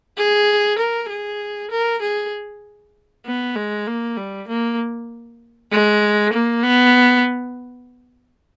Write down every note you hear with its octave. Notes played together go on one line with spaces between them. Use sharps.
G#4
A#4
G#4
A#4
G#4
B3
G#3
A#3
G3
A#3
G#3
A#3
B3